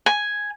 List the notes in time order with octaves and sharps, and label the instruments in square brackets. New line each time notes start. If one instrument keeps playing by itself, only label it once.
[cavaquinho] G#5